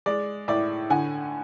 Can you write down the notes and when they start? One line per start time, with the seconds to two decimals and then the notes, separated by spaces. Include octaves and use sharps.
0.06 G#3 D5
0.48 A2 D5 E5
0.90 D3 F#5 G#5